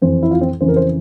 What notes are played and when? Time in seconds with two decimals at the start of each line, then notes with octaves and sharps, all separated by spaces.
0.02 F2 E3 C5
0.23 E4
0.31 F4
0.41 C4
0.61 F2 C#3 E3 C5
0.68 A#4
0.76 C5